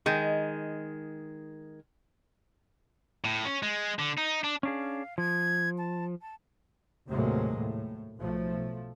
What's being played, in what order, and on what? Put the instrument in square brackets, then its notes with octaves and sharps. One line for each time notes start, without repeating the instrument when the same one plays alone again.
[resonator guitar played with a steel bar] D#3 G#3
[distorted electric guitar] A2
C#4
G#3
D3
D#4
D4
[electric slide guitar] C#4 D4 G#4 [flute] F5
[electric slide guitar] F3 [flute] G#6
[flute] A5
A5
[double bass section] D#2 A2 C3 F#3 G#3 A#3
A2
B1 F3 A3